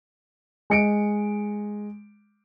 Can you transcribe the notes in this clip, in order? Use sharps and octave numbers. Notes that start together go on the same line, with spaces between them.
G#3 C#7 D7